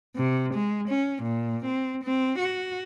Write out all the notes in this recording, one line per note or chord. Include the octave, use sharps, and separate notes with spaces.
C3
G#3
C#4
A#2
C4
C4
F#4